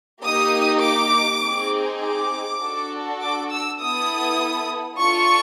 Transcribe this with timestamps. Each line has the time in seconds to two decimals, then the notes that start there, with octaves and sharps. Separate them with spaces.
0.23 A#3 D#4 G4 D#6
0.83 D6
1.43 C4 D#4 G#4
2.03 D6
2.62 D4 F#4 A4
3.21 D6
3.51 E6
3.81 B3 E4 A4 D#6
4.99 D4 F4 A4 C#6